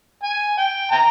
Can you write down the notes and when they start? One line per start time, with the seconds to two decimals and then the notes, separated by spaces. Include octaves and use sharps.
0.24 G#5
0.58 G5
0.91 G5 A#5